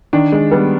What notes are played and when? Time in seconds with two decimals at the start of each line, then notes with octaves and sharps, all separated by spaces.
0.13 D#3 D4
0.32 G#3
0.52 G3 B3